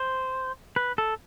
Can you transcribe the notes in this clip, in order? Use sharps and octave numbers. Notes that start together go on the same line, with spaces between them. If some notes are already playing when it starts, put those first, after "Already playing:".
Already playing: C5
B4
A4